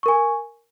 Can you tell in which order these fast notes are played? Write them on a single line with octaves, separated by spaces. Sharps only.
C#6 A#4 G#5